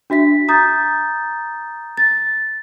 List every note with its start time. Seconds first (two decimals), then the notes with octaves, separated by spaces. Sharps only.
0.10 D4 F#4 E5 B6
0.48 A#5 D#6 G6 A6
1.97 A6